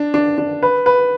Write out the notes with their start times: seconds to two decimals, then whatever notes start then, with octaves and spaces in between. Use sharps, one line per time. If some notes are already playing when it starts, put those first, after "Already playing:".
Already playing: D4
0.14 D4
0.38 D4
0.63 B4
0.86 B4